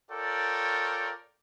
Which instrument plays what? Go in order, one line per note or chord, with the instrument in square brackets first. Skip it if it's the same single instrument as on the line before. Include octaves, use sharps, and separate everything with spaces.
[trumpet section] F4 A4 A#4 C#5 D5 G5